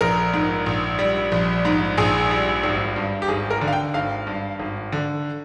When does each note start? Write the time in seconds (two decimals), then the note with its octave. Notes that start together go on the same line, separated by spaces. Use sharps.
0.01 A#1 A#4
0.33 G#2
0.66 A#1
0.99 G3
1.32 A#1
1.65 G#2
1.97 A#1 G#4
2.31 G3
2.63 G#1
2.96 G2
3.22 G4
3.28 G#1 G#4
3.50 A#4
3.61 D3
3.67 F5
3.73 G5
3.94 G#1 F5
4.27 G2
4.60 G#1
4.93 D3